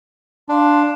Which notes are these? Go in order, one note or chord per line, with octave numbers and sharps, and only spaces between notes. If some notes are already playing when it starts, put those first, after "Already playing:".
D4 F5 A5 C6